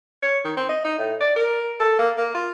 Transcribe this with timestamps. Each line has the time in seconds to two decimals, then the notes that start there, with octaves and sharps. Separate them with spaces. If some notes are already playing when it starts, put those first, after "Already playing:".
0.23 C#5
0.45 D#3
0.57 C4
0.69 D#5
0.84 D#4
0.98 A2
1.21 D5
1.36 A#4
1.80 A4
1.99 A#3
2.17 A#3
2.35 F4